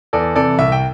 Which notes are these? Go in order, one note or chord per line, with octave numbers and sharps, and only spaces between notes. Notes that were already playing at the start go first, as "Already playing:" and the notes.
E2 A4 D5
C3 E3 A4 D5
C2 E5
G5